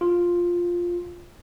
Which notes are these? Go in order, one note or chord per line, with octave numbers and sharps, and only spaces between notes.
F4